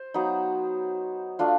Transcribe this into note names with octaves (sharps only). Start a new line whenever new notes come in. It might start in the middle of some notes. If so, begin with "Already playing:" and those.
Already playing: C5
F#3 B3 D#4
A3 D4 F4